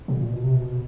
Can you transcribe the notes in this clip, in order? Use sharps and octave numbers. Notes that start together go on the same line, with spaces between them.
B2
A#2
B2
C3
B2